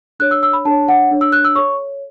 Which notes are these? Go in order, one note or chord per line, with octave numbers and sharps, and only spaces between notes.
D4 A4 C#5 F#6
E6
E6
B5
D4 A4 C#5 A5
F#5
D4 A4 C#5
E6
F#6
E6
A4 C#5 C#6